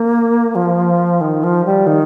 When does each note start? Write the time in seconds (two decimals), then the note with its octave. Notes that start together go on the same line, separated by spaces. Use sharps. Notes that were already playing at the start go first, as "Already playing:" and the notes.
Already playing: A#3
0.55 F3
1.21 D#3
1.44 F3
1.65 G3
1.87 D#3